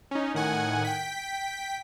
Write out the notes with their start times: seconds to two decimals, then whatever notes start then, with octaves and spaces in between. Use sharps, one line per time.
0.11 C#4 D#4
0.34 A2 D#3 F#5 G#5
0.84 G5 B6